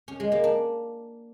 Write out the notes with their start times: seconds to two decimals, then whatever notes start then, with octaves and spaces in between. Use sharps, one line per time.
0.08 C#4
0.20 G#3
0.32 A#3
0.44 D4